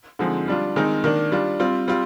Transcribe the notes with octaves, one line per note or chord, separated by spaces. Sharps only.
D3 F3 G#3 C4 D#4
G3 D4 F4
D#3 G#3 C4 D#4
D#3 A#3 D4
G3 D4 F4
G3 C4 F4
G3 C4 F4